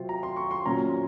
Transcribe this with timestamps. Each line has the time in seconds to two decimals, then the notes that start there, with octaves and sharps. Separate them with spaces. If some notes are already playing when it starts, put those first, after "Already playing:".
Already playing: C3 F#3 C4 F4
0.09 A#5
0.23 C6
0.36 C#6
0.51 C6
0.65 A#2 F#3 C#4 A#5